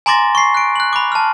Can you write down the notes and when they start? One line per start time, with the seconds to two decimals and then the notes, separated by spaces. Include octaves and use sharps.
0.06 G#5 A#5 C6 D6 A6 A#6
0.35 C#6 C7
0.54 F#6 D7
0.76 F#6 F#7
0.93 B5 D6
1.12 A5 F6